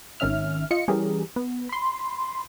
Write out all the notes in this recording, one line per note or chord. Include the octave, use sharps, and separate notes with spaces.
G#1 D#3 C#4 E5 F6
F4 D#5 C#7
E3 G3 C#4 G4 G#4 A#4
B3
B5 C6